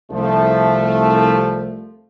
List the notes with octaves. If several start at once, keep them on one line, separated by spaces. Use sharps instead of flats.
C2 F3 A3